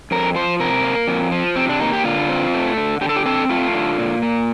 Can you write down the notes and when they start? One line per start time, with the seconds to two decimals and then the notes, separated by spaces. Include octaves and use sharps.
0.11 F2 A#4
0.35 F3 C5
0.60 C3 A#4
0.84 A#3
1.08 F2
1.32 F3
1.56 C3 C4
1.69 D4
1.80 A#3 D#4
1.93 G4
2.05 D3 F4
2.29 C4
2.54 A3
2.77 D3
3.01 D3 G4
3.09 A4
3.16 G4
3.26 C4 A4
3.49 A3 F4
3.73 D3
3.98 A#2
4.22 A#3